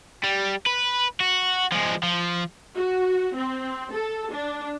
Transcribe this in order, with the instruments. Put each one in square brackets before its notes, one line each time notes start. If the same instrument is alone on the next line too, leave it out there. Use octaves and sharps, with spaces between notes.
[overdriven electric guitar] G3
B4
F#4
F3 G#3
F3
[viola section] F#4
C4
A4
D4